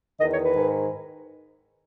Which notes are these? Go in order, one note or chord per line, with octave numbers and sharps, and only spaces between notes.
E2 D#3 D#5
C#5
B4
G#2 D#3